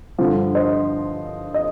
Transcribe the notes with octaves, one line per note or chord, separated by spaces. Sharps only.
G2 D3 F3
C5 D#5
D#5